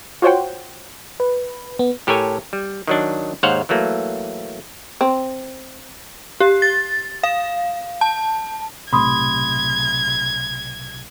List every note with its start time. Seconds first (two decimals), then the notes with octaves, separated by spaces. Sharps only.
0.22 F4 F#4 C5 C#5 F#5 G5
1.20 B4
1.79 B3
2.07 A2 G4 A4 A#4 C#5 G#5
2.53 G3
2.87 D#3 F#3 D4
3.43 D#2 G#2 C5 C#5 F5 F#5
3.69 E3 F#3 A3 A#3
5.01 C4
6.40 G4
6.62 A6
7.23 F5
8.01 A5
8.93 B1 A2 C3 B5 C6 D#6 G#6